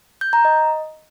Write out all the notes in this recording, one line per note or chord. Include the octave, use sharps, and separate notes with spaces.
G6
A#5
D#5